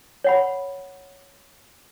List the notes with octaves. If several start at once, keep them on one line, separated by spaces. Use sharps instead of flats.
C#5 F#5 B5